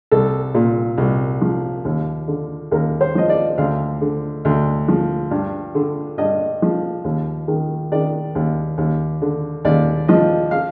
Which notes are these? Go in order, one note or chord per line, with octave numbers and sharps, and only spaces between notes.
C2 A4
A#2
C2
F3
D#2
D3
D#2 A#4
C5
F3 D#5
D5
D2 F5
D3
D2
F3
G2
D3
G2 D#5
F3
D#2
D#3
D#3 D5
D#2
D#2
D3
D#2 D5
F3 D#5
F5